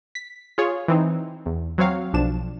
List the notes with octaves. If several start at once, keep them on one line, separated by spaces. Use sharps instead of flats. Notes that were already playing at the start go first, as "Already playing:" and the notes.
B6
F4 G#4 C#5
E3 C4 D#4
E2
F#3 C4 C#5 F5
B1 F3 D4 E7